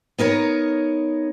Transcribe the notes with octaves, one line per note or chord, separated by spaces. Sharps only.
B3 D#4 A#4 C#5